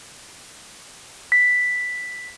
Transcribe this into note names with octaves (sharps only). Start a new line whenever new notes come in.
B6